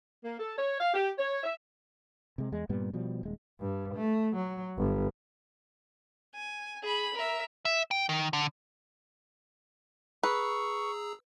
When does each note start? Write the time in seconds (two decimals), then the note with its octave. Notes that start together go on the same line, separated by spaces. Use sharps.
0.24 A#3
0.39 A4
0.58 C#5
0.80 F5
0.93 G4
1.18 C#5
1.42 E5
2.38 C3 G#3
2.52 E2 G#3
2.69 G2 A#2 G3 B3
2.93 B2 F3 G3
3.23 D#1 G#3
3.60 G2
3.94 A3
4.36 F#3
4.78 G1
6.35 G#5
6.83 G#4 B5
7.14 A#4 E5
7.65 E5
7.91 G5
8.09 D#3
8.33 D3
10.23 G#4 B4 A#5 C#6 E6